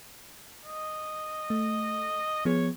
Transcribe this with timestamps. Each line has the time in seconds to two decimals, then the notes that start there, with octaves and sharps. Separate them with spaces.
0.65 D#5
1.50 A3
2.45 F3 B3 G#4 C#5